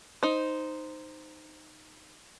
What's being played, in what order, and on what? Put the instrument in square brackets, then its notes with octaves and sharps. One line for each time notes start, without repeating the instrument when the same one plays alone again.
[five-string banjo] D#4 C5